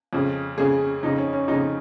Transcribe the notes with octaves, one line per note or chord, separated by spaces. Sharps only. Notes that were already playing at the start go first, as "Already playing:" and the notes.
F2 C#3
F2 C#3 G#4
F2 C#3 D#4
C#4
C#4
F2 C#3 D#4